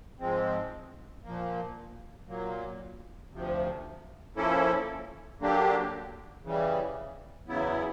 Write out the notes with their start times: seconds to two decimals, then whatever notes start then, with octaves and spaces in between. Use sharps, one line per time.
0.19 G#2 F3 G#3 C4
1.24 A#2 F3 A#3
2.27 A#2 F#3 A#3
3.32 D2 C3 F3
4.36 F3 A#3 C#4 E4 A4
5.40 D3 F#3 A#3 D4 G4
6.44 C#3 E3 G3
7.48 E2 C#3 F#3 B3 E4